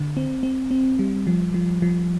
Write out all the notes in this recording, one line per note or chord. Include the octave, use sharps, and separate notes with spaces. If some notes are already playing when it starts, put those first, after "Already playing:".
Already playing: D3
C4
C4
C4
G3
F3
F3
F3